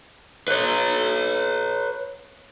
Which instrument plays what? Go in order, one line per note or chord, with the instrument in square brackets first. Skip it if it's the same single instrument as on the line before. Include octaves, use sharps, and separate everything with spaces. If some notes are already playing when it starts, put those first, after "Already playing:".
[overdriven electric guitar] B4 C#5